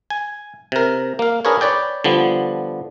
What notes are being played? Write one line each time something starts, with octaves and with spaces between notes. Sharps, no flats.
G#5
C3 A#4
A#3 F5
D4 G#4 A#4 B4 C#5
B4 C#5 D5 G5
D3 F3 G3 B3